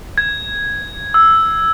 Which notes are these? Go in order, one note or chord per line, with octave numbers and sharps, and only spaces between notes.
G#6
E6